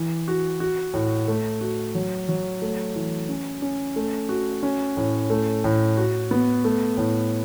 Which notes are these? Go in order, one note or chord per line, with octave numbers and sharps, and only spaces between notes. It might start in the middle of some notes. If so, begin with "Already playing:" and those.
Already playing: E3
F#4
F#4
A2
A3
F#4
F#3
F#3
A3
E3
C#4
C#4
A3
F#4
C#4
A2
A3
A2
F#4
B3
A3
A2